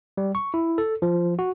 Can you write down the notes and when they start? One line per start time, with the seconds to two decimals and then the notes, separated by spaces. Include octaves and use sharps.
0.17 G3
0.35 C#6
0.54 E4
0.78 A4
1.02 F3
1.39 F#4